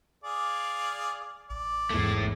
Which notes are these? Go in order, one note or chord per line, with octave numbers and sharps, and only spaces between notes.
G#4 D5 F5
A1 D5
E2 G#2 A3 E4